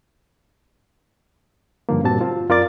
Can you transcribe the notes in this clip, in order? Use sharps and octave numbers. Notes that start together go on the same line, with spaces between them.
G2 D3 F3 A#3
G2 A#2 G3 C4 F#4 A5
C4 F4
F#2 F4 A#4 D5 D6 A6